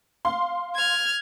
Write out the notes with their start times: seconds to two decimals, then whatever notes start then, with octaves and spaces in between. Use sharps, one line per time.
0.25 F5 C6
0.76 F6 G#6